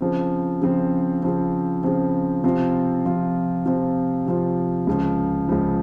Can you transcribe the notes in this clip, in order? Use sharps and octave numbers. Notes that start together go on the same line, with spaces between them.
C#3 F3 C4
C#3 F3 C4
C#3 F3 C4
C#3 F3 C4
C3 F3 C4 F4
C3 F3 C4 F4
C3 F3 C4 F4
C3 F3 C4 F4
C#2 C#3 F3
C#2 C#3 F3